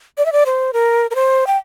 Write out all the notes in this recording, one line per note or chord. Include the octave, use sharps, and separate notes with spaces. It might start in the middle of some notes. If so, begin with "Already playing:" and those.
D5
E5
D5
C5
A#4
A#4
C5
G5